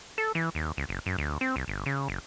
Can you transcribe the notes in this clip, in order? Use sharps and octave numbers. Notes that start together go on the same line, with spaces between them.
A4
E3
D#2
C#2
F#1
F#2
D2
C4
C2
G1
C#3
F#1